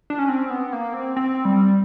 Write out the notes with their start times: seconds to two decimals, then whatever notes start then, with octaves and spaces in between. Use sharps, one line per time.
0.10 D4
0.19 C#4
0.29 C4
0.50 B3
0.73 A#3
0.94 C4
1.16 C4
1.45 G3